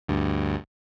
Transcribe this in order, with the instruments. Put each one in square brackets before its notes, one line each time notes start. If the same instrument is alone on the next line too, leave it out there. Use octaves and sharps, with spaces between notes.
[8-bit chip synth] D2 G2